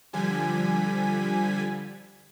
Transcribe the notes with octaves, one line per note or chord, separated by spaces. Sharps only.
D3 F3 G3 G#5 G#6 B6